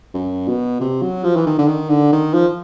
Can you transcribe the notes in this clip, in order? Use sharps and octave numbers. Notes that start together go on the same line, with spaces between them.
F#2
B2
C3
F#3
F3
E3
D#3
D3
D#3
D3
D#3
F3